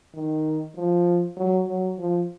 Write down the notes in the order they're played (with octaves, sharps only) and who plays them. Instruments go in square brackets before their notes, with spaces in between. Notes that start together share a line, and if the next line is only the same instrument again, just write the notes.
[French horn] D#3
F3
F#3
F#3
F3